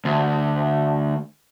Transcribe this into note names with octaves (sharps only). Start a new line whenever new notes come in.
D2